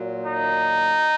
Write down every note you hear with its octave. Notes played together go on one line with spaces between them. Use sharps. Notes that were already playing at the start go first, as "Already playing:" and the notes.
Already playing: A#2 F#3
D#4